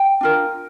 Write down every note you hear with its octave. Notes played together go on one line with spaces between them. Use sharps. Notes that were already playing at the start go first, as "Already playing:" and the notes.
Already playing: G5
D4 F4 A#4